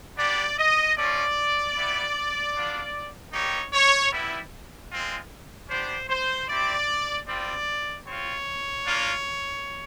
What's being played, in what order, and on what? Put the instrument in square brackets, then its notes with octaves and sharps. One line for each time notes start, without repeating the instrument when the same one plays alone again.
[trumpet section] B3 D4 G4 D5
D#5
A3 C#4 F4 D5
G3 B3 E4
B3 D4 F4
G3 A#3 D#4 G4 C#5
C#5
G3 B3 E4
G#3 C4 F4
B3 D4 G4 C5
C5
C4 E4 G4 D5
G3 C4 F4 D5
C4 F4 C#5
A#3 D4 F4